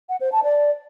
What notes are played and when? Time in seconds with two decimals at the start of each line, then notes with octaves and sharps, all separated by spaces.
0.09 F#5
0.20 C5
0.32 A5
0.43 D5